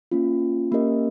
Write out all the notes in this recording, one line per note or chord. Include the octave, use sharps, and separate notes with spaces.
A#3 C#4 F4
A#3 C#4 G4 A#4 D#5